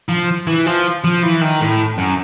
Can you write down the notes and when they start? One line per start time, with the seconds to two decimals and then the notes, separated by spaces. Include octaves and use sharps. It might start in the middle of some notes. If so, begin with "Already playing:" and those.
0.09 F3
0.47 E3
0.66 F3
1.04 F3
1.23 E3
1.41 D#3
1.61 A2
1.98 F#2